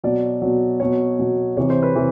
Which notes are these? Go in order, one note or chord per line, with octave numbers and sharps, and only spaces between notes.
B2 F#3 D5
B2 F#3
B2 F#3 C#5
B2 F#3
C3 E3 C#5
C5
B4
C3 E3